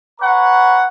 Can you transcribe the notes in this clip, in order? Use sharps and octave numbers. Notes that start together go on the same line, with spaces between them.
B4 C#5 F#5 A#5 C#6